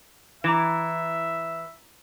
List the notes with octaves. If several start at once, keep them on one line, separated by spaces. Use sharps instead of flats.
E3 E5 A#5 D6 E7